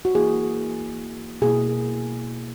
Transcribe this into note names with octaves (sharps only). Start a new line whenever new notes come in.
F#4
E3 A#3 E4 G#4
B2 A#3 E4 G#4